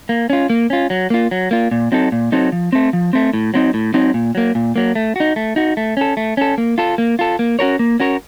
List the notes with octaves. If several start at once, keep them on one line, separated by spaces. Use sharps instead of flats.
A#3
C#4 F4
A#3
C#4 F4
F#3
A#3 F4
F#3
A#3 F4
A#2
F#3 C4 D#4 A4
A#2
F#3 C4 D#4 A4
F3
A3 C4
F3
A3 C4
A2
F#3 C4 D#4
A2
F#3 C4 D#4
A#2
F#3 A#3
A#2
F#3 A#3
A3
D#4 F#4
A3
D#4 F#4
A3
C#4 A4
A3
C#4 A4
A#3
F4 A4
A#3
F4 A4
A#3
C#4 F#4 A#4 C#5
A#3
C#4 F#4 A#4 C#5